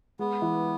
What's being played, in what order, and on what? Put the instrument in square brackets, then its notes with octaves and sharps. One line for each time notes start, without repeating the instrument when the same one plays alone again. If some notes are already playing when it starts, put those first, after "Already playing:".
[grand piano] G#3 [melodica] B3
[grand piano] E3